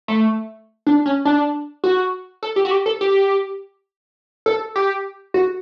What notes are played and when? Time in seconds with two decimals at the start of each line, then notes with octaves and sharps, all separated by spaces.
0.08 A3
0.87 D4
1.06 C#4
1.25 D4
1.84 F#4
2.43 A4
2.56 G4
2.65 F#4
2.71 G4
2.86 A4
3.01 G4
4.46 A4
4.76 G4
5.34 F#4